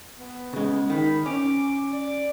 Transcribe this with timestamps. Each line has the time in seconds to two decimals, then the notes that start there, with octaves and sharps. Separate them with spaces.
0.18 B3
0.53 C#3 G#3
0.90 D#3 B5
1.26 C#4 D6
1.92 D5